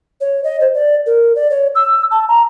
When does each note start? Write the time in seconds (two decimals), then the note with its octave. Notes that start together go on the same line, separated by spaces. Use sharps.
0.21 C#5
0.44 D#5
0.60 C5
0.74 D5
1.06 A#4
1.35 D5
1.51 C#5
1.75 E6
2.11 A5
2.28 A#5